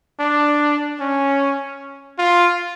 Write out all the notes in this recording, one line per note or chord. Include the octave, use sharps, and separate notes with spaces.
D4
C#4
F4